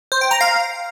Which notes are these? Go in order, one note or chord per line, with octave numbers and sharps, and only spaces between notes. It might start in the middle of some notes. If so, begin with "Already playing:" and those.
C5
G5
A#5
F5